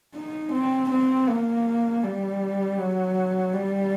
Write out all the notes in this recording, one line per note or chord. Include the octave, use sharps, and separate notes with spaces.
D#4
C4
C4
A#3
G3
F#3
G3